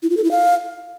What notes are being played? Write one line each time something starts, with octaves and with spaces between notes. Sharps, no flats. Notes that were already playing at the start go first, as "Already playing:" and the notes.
E4
F4
A4
E4
F5